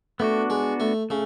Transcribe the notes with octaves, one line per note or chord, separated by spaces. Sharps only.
A3 B3 D4 F#4
G#3
A3
C#3 A3